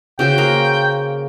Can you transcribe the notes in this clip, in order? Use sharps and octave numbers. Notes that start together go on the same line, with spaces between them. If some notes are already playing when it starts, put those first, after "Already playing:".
C#3 F#4 C5 G5
A#3 G#4 A#4